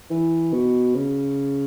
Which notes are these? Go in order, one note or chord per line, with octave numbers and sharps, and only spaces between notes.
E3
B2
C#3